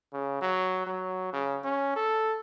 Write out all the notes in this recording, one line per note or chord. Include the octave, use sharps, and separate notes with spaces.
C#3
F#3
F#3
C#3
C#4
A4